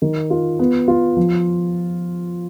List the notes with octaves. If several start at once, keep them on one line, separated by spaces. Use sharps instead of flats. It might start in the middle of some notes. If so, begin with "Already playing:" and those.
D#3
F4
B3
F4
F3